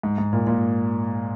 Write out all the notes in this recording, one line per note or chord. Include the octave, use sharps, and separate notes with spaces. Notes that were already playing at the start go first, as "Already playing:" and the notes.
G#2
G#2
A#2
A#2